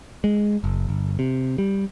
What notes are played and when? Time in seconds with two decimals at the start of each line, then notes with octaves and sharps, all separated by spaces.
0.24 G#3
0.64 F#1
0.88 G1
1.19 C3
1.58 G3